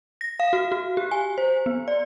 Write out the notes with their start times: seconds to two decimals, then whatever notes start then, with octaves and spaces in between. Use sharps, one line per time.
0.21 A#6
0.40 F5
0.53 F#4
0.72 F#4
0.97 G4
1.11 G#5
1.38 C5
1.66 B3
1.88 D5